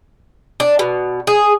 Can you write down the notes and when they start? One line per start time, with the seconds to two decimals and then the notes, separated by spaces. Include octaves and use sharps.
0.60 D4
0.79 B2
1.27 G#4